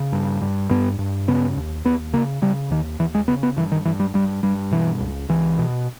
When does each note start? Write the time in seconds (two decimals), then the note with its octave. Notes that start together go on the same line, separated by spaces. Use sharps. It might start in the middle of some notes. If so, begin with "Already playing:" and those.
Already playing: C#3
0.12 G2
0.42 G2
0.71 G2 B3
0.99 G2
1.28 C#3 B3
1.56 D#2
1.85 D#2 B3
2.13 C#3 A#3
2.42 C#3 G3
2.71 D#2 D#3
2.99 D#2 E3
3.15 G#3
3.28 C#3 B3
3.43 B3
3.57 G2 E3
3.72 D#3
3.85 G2 E3
4.00 G3
4.14 G2 G3
4.43 G2 G3
4.71 B2 E3
5.00 C#2
5.29 C#2 E3
5.58 B2